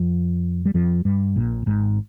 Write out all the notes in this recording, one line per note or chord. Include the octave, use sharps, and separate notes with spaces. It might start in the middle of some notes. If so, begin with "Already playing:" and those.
Already playing: F2 F3
G3
F2 F3
G2 G3
A#1 A#2
G#1 G#2